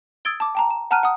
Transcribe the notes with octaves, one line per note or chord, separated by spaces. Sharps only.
D#6 E6 G#6 A6 D7 G7
A5 D6
G5 A5 A#5
E7
F#5 A5 A#5 F6 F#6 D#7
F#5 D#6